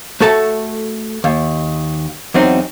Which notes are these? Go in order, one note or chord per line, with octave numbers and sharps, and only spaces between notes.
A3 F#4 A4 E5 A5
D#2
E2 F#3 C4 D#4